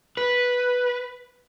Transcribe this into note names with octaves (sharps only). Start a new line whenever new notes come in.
B4